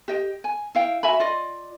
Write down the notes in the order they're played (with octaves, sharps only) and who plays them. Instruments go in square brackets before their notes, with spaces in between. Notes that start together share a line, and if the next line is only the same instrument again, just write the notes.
[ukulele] G4 D#5 G5
G#5
E4 F5 G5
F#4 E5 G#5 B5
F4 D5 D#5